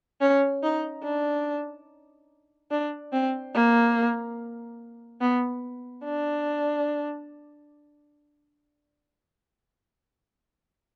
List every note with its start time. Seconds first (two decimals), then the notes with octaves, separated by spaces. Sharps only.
0.21 C#4
0.63 D#4
1.04 D4
2.71 D4
3.13 C4
3.55 A#3
5.21 B3
6.04 D4